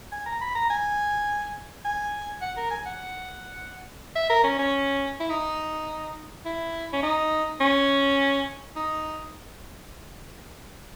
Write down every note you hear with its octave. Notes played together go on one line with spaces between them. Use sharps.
G#5
A#5
B5
A#5
G#5
G#5
F#5
A#4
G#5
F#5
E5
A#4
C#4
C#4
E4
D#4
E4
C#4
D#4
C#4
D#4